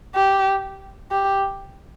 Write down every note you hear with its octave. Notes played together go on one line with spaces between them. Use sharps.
G4
G4